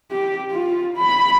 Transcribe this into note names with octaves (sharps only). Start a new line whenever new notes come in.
G4
F4
B5